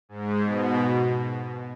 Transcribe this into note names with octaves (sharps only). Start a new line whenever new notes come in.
G#2
B2